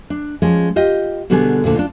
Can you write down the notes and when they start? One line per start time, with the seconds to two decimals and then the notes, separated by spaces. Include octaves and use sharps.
0.10 D4
0.42 F3 G#3 C#4
0.76 F4 G4 D#5
1.30 B2 D3 G3 B3 D4 G#4
1.64 D2 A#2 D3
1.76 D4 D#4 F4